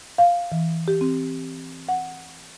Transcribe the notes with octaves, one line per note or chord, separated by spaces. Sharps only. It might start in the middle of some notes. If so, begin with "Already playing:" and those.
F5
E3
G4
C4
F#5